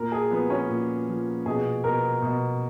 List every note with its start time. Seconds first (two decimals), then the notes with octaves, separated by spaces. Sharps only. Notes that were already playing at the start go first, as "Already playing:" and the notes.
Already playing: A#2 A#4
0.12 G#4
0.31 F3 B3
0.50 C#4
0.70 A#2
1.08 F3
1.46 B2 G#4
1.84 B2 A#4
2.22 B2